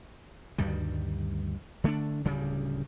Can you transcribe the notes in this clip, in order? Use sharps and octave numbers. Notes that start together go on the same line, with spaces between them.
D2 G2 D#3 G3
D3 A3 A#3 D4
D1 D2 C#3 G3